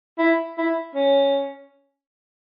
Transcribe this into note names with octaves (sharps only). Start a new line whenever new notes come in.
E4
E4
C#4